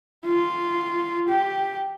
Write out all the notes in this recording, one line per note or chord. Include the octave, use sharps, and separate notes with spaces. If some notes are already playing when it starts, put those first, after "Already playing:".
F4
G4